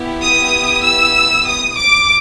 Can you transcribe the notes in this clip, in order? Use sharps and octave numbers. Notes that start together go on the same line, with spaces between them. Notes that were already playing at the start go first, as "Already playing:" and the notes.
Already playing: B3 E4 G4
D#6
E6
D#6
D6